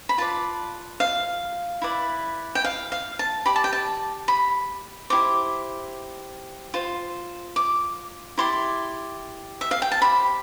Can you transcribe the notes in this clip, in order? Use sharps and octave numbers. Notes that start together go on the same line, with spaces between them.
B5
F4 B4 D5 A5
F5
E4 B4 D5
G5
F5
F5
A5
G4 D5 B5
A5
G5
A5
B5
E4 G4 C5 D6
F4 C5
D6
E4 G4 D5 C6
E5
F5
G5
A5
G4 C5 B5